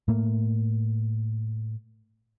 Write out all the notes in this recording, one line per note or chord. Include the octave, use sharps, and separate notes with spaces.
A2 A3 A#3